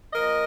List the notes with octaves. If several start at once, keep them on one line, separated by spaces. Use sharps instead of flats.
A#2 F3 A#4 D#5